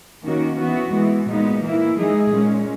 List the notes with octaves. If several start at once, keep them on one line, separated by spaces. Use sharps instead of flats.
D#3 A#3 C#4 F#4
E3 B3 F#4
E3 G#3 B3
A#2 G#3 B3 D#4
E3 A#3 E4
E3 G#3 D#4 G#4
A#2 G#3 C#4